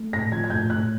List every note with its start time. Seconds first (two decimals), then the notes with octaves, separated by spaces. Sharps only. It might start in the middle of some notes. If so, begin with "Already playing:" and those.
Already playing: A3
0.13 A2 A#6
0.32 F3 G#6
0.44 G#6
0.50 A2 G6
0.70 A2 F#6